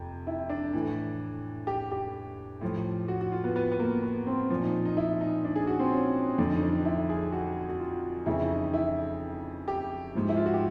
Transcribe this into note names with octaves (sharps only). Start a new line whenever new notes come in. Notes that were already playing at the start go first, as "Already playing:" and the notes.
Already playing: F2 C3
E4
D4
A2 E3
G4
G4
A2 F3
F#4
F#4
F4
B3
B3
B3
A#3
B3
C4
A#2 F3
D#4
D#4
E4
D#4
D4
G#4
F#4
C4
C#4
F2 D3 F3 D4
D#4
D4
D#4
E4
G#4
F#4
F#4
F4
F2 C#3 E3 E4
E4
D#4
E4
G4
G#2 F3
E4
F4
F#4
G4